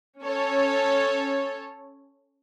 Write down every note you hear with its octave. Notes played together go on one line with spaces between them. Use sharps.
C#4 A4 C#5